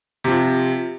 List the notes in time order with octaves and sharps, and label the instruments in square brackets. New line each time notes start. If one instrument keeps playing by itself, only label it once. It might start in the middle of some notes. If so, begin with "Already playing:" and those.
[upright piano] C3 F3